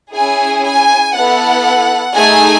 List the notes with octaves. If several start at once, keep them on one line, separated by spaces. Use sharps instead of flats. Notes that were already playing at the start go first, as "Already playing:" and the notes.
C#4 E4 G#4 G#5
G#5
B3 E4 A4 F#5
A3 D#4 G#4 G#5